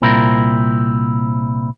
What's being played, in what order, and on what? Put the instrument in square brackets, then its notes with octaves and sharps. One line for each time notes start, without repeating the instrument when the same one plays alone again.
[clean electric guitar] C2 A#2 C4 E4 A#4